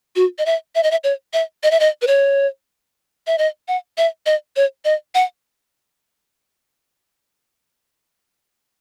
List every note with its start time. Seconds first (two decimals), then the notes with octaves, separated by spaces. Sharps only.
0.16 F#4
0.38 D#5
0.46 E5
0.75 E5
0.83 D#5
0.91 E5
1.04 C#5
1.33 E5
1.63 D#5
1.71 E5
1.80 D#5
2.02 B4
2.07 C#5
3.27 E5
3.38 D#5
3.68 F#5
3.98 E5
4.26 D#5
4.56 C#5
4.85 D#5
5.15 F#5